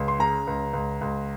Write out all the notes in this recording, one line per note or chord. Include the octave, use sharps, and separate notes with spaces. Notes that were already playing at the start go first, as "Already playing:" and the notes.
Already playing: C#2
C6
C#3 A#5
C#2
C#2
C#2